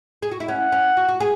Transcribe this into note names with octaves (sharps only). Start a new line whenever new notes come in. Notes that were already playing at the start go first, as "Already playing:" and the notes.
G#4
F#4
E4
C#4 F#5
C#4
F#4
F#4
G#4